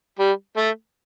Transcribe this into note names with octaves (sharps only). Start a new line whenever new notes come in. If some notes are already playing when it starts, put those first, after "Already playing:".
G3
A3